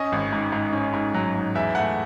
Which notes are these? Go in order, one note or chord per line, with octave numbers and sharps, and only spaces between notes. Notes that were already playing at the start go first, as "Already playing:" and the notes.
Already playing: C#4 D#5
G#1
G#2
G#2
C#4
G#2
F#3
G#2
E2 E5
A3 F#5